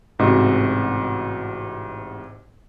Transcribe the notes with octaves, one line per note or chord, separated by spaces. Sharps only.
A1 G#2 C3 F#4 D#5